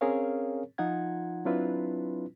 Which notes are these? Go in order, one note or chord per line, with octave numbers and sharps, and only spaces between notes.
C4 C#4 G#4 A#4 C#5 F5
F3 D#4 F4 F#5 G#6
F#3 C4 D4 E4 F4 B4